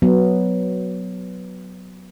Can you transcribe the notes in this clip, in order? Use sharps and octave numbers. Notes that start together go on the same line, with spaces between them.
F#3 B3